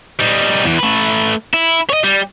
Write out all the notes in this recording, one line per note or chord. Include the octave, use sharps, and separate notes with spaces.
G3 D#4
E2 E3
A3 B4
E4
C#5 D#5
G3